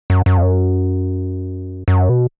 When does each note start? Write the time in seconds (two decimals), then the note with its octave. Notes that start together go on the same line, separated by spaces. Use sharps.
0.10 F#2
0.26 F#2
0.38 F2
0.42 F#2
1.88 F#2
2.09 B2